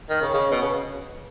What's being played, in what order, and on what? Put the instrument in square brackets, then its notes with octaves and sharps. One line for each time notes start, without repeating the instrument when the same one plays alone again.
[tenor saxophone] D#3
C#3
C#3
B2
C#3